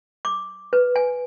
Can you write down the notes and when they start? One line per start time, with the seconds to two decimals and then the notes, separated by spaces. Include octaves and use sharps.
0.25 D6
0.73 B4
0.96 G#5